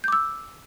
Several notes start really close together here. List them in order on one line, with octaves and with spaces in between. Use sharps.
G6 D6 E6